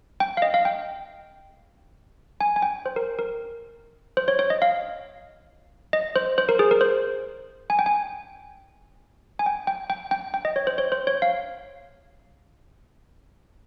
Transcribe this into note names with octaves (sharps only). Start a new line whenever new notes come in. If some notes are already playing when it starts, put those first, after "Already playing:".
G5
F5
D#5
F5
G5
G#5
G#5
G5
C5
A#4
A#4
C5
C#5
C#5
D#5
F5
D#5
C5
C5
A#4
G#4
A#4
C5
G#5
G5
G#5
G#5
G5
G5
G5
G5
G5
D#5
C#5
C5
C#5
C5
C#5
F5